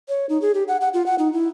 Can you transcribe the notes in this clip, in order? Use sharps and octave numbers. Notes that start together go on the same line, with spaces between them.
C#5
D#4
G#4
G4
F#5
F#5
F4
F#5
D#4
E4